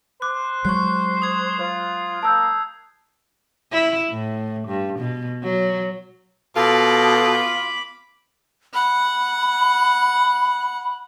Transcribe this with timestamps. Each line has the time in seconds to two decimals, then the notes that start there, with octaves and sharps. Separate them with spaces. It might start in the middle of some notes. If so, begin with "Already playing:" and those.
0.22 C5 D6 F#6
0.65 F#3 G#3 C#6 F#6 C7
1.22 D#6 G#6
1.59 F4 C5
2.23 A#3 A5 E6 G6
3.72 E4
4.10 A2
4.67 G2
4.99 B2
5.43 F#3
6.56 B2 F4 A4 B5 D6
8.74 F#5 B5